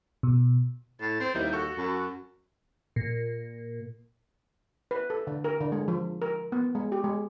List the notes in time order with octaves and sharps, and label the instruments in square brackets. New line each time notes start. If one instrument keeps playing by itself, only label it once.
[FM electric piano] B2
[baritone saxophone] A2 [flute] A6
[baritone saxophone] C4 [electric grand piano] C5
[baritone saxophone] D#2 [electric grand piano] G3 D#4 E4 [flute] G6
[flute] F#4 [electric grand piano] A4 C#6
[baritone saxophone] F#2
[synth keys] A#2
[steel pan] B4
A4
D3
A#4
D3
G#3
F3
A#4
B3
G#3
G4
G#3